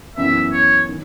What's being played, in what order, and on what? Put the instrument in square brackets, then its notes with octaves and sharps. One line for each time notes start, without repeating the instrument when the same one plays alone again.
[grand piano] F#2 E3 B3 E4 [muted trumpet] E5
[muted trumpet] C#5
[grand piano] D#3